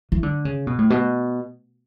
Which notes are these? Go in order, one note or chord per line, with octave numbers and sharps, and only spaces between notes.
E3
D3
C#3
B2
A2
B2